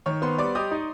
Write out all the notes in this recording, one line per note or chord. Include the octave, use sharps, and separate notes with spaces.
D#3 C#5 C#6
B3 C5 C6
G3 D5 D6
G4 D#5 D#6
D#4